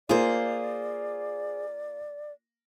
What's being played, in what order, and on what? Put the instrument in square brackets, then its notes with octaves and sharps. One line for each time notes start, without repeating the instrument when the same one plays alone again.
[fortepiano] A#3 F4 [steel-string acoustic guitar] G#4 C5 [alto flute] D5